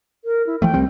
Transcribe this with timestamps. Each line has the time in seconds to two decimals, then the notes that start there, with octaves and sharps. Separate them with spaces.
0.25 A#4
0.47 E4
0.62 E3 F3 A3 G5
0.74 C2 G3 C4